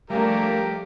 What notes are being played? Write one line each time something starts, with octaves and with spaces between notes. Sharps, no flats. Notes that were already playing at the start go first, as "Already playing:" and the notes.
F3 G3 A3 A#3 D4 G4 A#4